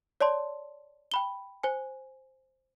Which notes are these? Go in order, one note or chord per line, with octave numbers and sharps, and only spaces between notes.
C#5 D5 A5 C6
G5 B5 G7
C5 G#5